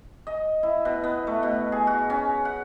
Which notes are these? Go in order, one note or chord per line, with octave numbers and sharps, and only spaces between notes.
D#5
E4
B2
B3
A3
B2
G#4
F#4
C#4
F#5